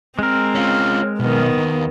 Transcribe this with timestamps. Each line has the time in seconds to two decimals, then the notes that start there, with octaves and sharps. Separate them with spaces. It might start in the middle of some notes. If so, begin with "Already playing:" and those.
0.19 G#3 C4 A#4
0.55 C#4 F4
1.20 B1 D#3 B3
1.58 D#2